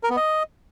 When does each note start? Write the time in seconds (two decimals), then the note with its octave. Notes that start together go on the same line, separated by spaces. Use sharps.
0.03 A#4
0.10 B3
0.16 D#5